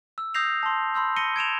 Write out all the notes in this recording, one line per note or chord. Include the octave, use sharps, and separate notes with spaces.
E6
D#6 E6 G6 A#6 C7 F7
A5 C6
B5 C6 E6 G6
C6 A#6 C#7 D#7 G7
G#6 D7 E7 F7